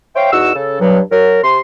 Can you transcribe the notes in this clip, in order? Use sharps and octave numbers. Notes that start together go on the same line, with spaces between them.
C5 C#5 E5 F5 G5
E2 D#4 F#4 E6
C#3 A4
G2 F#3
F#3 A#4
C3 C6